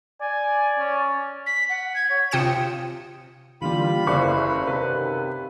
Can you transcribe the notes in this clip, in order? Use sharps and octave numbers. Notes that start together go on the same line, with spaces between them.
D5 G#5
C#4
B6
F#5
G#6
C#5
C3 F4 G5 D#6 C#7 E7
D3 E3 G3 A#3 F4 B5
F#1 E2 E4 C5 D5 F5 C#6
F#2 C3 D#3 B4